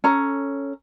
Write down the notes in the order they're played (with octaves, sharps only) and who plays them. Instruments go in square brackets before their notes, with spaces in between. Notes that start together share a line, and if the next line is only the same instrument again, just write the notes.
[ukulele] C#4 A4 A#5